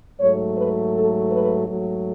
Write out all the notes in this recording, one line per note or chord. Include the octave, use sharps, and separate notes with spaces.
G#2 F#3 A3 C#5
B4
A4
B4
G#2 F#3 A3